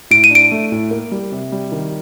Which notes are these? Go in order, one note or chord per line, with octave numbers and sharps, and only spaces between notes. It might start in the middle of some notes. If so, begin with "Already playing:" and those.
A2 D7
D#7
D4 D7
A3
A2
A#3
G3
C3
G3
D#3